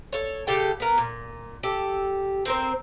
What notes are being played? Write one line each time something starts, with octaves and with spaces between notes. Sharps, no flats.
A4 C#5
C#3 G4 A4 G5
B3 A#4
A#2
G4 A4
C4 A#4 C5